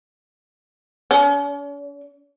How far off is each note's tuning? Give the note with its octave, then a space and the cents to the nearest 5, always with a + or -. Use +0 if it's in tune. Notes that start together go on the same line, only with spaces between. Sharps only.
C#4 +45